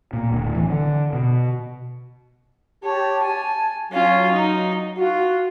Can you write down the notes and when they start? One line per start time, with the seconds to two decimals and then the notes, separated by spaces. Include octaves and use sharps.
0.13 A#2
0.32 D1
0.55 E3
0.70 D3
1.13 B2
2.84 G4 C#5 A5
3.24 G#5 A5
3.92 F#3 C#4 F4
4.32 D#4
4.98 F4 F#4